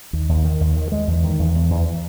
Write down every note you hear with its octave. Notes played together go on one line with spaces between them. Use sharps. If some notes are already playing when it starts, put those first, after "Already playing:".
D#2
D#2
D#3
D#2
D#3
G#3
E2
D#3
E2
E2
E2